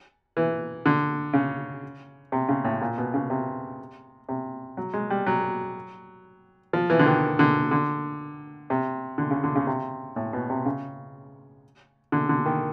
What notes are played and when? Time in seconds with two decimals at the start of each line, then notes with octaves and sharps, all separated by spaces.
0.37 E3
0.86 D3
1.33 C#3
2.32 C3
2.49 C#3
2.64 A2
2.81 A#2
2.98 B2
3.14 C#3
3.30 C3
4.29 C3
4.77 F#3
4.94 G#3
5.10 G3
5.26 F#3
6.73 F3
6.90 E3
6.99 D3
7.06 D#3
7.39 D3
7.71 D3
8.70 C3
9.18 D3
9.31 C#3
9.44 D3
9.56 C#3
9.67 C3
10.16 A2
10.33 B2
10.50 C3
10.66 C#3
12.12 D3
12.29 D3
12.46 D#3